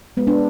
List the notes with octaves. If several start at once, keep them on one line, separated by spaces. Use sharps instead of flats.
G#3 B3
B3 D4